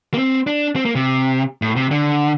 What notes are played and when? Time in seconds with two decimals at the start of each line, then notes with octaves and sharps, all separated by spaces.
0.14 A#3
0.18 C4
0.47 D4
0.76 C4
0.85 A#3
0.95 C3
1.62 A2
1.76 C3
1.91 D3